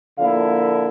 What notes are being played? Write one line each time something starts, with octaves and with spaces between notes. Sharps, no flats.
D3 F3 A#3 E4 F5